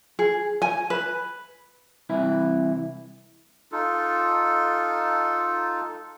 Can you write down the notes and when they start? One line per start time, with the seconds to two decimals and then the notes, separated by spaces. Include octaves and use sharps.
0.19 G#4
0.62 G#5
0.90 B4
2.09 C2 E3 E4
3.72 D#4 F4 A4